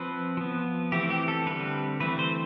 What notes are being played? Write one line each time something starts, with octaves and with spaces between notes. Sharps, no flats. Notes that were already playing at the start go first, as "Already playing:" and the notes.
Already playing: F3 C4 B4
F3 B3
E3 A3 C4 G4
G4
A4
D3 G3 C4 B4
E3 A3 C4 B4
C5